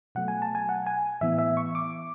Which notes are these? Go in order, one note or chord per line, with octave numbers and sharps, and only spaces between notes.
B2 F#3 A3 F#5
G#5
A5
G#5
F#5
G#5
A2 E3 B3 E5
E5
C#6
D6